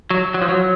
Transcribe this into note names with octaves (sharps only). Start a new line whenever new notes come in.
F#3
F#3
F3
F#3